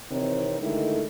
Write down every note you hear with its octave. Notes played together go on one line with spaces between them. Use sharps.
C3 D#3 E3 C4 D#4 C#5
D3 D#3 G#3 A3 E4 A4